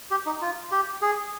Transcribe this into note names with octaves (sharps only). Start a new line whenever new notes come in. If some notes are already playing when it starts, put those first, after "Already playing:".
G4
D#4
F4
G4
G#4